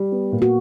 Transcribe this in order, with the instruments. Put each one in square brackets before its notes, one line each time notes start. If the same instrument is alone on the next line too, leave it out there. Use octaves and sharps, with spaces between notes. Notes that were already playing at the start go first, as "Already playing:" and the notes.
Already playing: [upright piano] G3
B3
A#2
[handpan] F#4